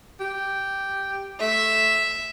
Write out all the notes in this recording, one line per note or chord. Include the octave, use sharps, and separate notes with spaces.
G4
A3 E5